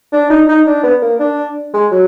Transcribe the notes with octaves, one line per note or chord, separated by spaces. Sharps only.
D4
D#4
D#4
D4
B3
A#3
D4
G#3
F#3